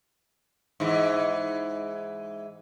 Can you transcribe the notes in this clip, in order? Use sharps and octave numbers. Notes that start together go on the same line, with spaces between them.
G#2 E3